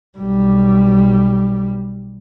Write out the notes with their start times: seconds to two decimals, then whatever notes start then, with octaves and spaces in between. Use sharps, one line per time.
0.18 B1 G3